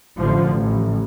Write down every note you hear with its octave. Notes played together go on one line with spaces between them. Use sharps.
A1 D3 F3
A1